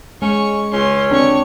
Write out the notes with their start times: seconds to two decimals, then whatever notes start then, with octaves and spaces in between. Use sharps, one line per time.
0.22 G#3 C#4 C#6
0.73 C#2 C#4 C6
1.11 C4 D4 C#5 C#6